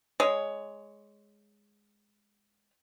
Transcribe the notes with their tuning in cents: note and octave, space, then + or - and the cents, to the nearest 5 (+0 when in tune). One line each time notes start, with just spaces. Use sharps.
G#3 +0 C#5 +10